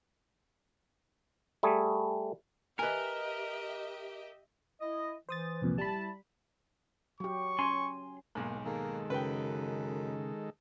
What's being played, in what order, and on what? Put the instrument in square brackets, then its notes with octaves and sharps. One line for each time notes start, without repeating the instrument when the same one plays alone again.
[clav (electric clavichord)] G3 A3 G#4
[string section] G4 D#5 E5 [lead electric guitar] A#4 [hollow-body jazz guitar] B4 G#5
[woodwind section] E4 D#5
[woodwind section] E3 [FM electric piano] C5 D#6 A6
[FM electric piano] C2 F2 A#2
[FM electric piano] G3 B5 [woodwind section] E4 A5
[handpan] F#3 G4 [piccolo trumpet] C#6
[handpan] C#4 [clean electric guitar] G#5 C6
[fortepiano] B1 G#2 [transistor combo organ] A#3
[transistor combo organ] D#3 G#3 A4 [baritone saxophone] A#3
[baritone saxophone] F#2 [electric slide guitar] C#3 [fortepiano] B4 G5